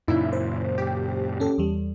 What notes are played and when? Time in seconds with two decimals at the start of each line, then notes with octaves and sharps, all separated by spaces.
0.08 F#2 A#2 C#3 D#4 E4
0.33 C5
0.78 G4
1.40 C#4 A4
1.58 E2 G3